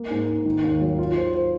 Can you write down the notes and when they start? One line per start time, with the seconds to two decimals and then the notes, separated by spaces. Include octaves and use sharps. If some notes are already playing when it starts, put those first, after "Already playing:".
Already playing: A#3
0.11 G#2
0.28 G#2
0.45 D#3
0.64 D#2
0.81 F#3
0.99 F4
1.17 C5
1.34 C5